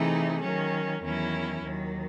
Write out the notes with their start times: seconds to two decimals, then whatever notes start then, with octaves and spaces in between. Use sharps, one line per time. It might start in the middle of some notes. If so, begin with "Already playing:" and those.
Already playing: C3 E3 A3 D#4 G#4
0.41 D#3 F#3 C#4
1.02 E2 D#3 F#3 C#4 E4
1.63 D#2 D#3 F#3